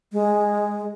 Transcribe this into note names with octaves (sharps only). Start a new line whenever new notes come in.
G#3